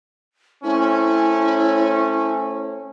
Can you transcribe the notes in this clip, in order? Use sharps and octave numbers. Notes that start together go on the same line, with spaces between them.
A3 C4 C#4 E4